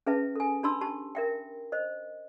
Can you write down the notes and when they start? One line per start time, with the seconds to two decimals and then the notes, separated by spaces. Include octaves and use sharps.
0.07 C#4 G#4 B4 E5 A5
0.35 A4 G#5
0.63 D4 G4 A5 B5 C6 E6
0.81 G4 A5
1.15 A#4 E5 G5
1.72 C5 D#5